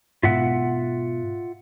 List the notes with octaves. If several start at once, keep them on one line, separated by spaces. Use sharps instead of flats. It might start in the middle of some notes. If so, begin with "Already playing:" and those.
G#2 B2 F4 E5 F#5